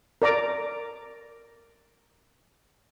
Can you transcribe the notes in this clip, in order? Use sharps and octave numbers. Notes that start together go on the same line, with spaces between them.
A#4 D5 A#5 D6